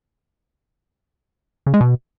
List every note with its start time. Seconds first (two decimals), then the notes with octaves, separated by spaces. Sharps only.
1.67 C#3
1.74 G#3
1.81 B2